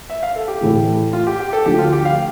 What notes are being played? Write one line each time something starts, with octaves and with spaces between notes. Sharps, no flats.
E5
F5
A4
G4
A2 E3 A3
F4
G4
G4
A4
D2 D3 F3 G4
F4
G4
F5